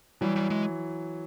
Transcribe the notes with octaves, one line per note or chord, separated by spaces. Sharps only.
E3 F#3 G3
G3
G#3